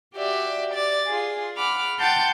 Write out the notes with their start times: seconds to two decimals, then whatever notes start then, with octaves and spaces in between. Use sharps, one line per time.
0.15 F#4 G4 D5 E5
0.73 D5 A6
1.07 F4 G#4
1.56 F#5 B5 D6 F6
1.99 F#5 G5 A5 C6 G6 A6